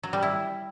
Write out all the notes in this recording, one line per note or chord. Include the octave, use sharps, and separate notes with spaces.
F#3
G3
E4